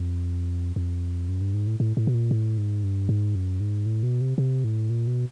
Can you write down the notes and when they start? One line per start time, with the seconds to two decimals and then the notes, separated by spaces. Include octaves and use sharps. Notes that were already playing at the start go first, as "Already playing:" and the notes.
Already playing: F2
0.76 F2
1.29 F#2
1.41 G2
1.54 G#2
1.67 A2
1.80 A2
1.97 A2
2.07 B2
2.14 A#2
2.31 A2
2.58 G#2
2.84 G2
3.09 G#2
3.35 F#2
3.60 G#2
3.86 A2
4.03 B2
4.21 C3
4.38 C3
4.64 A2
4.90 A#2
5.07 B2